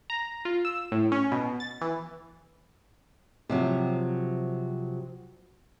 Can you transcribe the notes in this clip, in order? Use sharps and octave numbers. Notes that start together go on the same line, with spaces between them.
A#5
F4
E6
A2
C#4
B2
A6
E3
C3 F3 F#3